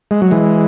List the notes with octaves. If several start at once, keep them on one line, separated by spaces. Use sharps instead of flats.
G#3
F#3
E3 G#3